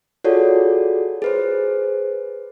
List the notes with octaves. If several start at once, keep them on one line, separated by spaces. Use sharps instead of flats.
F4 F#4 G#4 A4 C#5 D5
G#4 B4 C5